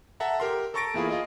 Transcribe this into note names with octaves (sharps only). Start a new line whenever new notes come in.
A4 E5 F#5 A5 A#5
G4 A#4 C6
A4 A#5 C#6 A6 A#6 D7
E2 A#3 E4 F4 G#4 B5
F4 G#4 D#5